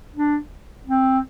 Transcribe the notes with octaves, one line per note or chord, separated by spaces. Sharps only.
D4
C4